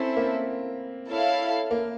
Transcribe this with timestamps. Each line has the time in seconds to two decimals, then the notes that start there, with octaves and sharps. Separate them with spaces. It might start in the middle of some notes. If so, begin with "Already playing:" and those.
Already playing: C4 C#4 E4 A4 C5 E5
0.16 A#3
1.09 E4 A4 C#5 F5
1.71 A#3